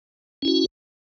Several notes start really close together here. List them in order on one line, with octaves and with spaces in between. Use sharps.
C#4 E4 F#4